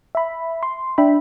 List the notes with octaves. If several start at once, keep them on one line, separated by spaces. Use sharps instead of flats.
E5 B5
C6
D4 E5 G5 B5